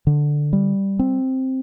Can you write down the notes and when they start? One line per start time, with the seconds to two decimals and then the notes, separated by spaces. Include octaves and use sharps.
0.07 D3
0.53 G3
0.99 C4